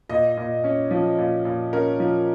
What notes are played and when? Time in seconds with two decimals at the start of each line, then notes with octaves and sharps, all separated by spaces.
0.09 A#2 D#5
0.37 A#2
0.64 C#4
0.91 F3
1.18 A#2
1.45 A#2
1.73 C#4 A#4
2.00 F3